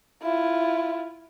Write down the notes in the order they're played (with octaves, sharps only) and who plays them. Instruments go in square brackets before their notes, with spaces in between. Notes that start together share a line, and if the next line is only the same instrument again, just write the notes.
[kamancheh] E4 F4